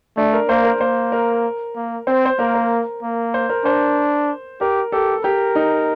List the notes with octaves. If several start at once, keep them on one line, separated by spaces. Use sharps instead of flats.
A3 D4
A#4
A#3 C5
A#4
A#3 C5
A#4
A#3
C4 C5
C5
A#3 A#4
A#4
A#3
C5
A#4
D4 C5
G4 A#4
G4 A4
G4 A#4
D#4